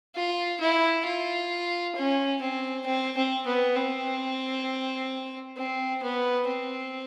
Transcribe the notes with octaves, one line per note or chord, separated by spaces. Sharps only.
F4
E4
F4
C#4
C4
C4
C4
B3
C4
C4
B3
C4